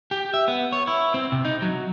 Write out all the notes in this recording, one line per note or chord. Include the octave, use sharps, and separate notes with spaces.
G4
E5
B3
C#5
E4
C4
C3
D#4
F#3